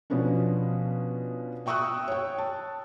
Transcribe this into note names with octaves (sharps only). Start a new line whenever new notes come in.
B2 F3 B3 C#4 D4
E5 G5 C#6 D#6 E6 F#6
C#5 G5
A5